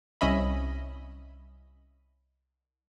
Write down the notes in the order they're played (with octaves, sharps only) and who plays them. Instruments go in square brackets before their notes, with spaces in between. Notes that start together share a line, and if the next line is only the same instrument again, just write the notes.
[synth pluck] C2 C#4 D#5 E5 B5